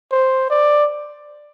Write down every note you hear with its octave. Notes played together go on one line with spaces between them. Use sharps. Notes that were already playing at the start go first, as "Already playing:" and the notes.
C5
D5